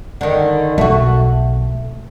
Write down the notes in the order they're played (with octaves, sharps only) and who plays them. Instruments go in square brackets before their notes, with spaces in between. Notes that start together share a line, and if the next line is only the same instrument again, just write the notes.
[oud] D3 D#3
[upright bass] B1 [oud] A3 F#4